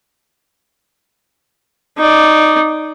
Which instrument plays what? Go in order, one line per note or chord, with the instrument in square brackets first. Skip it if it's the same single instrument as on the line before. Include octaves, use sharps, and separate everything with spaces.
[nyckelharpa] D#4 D5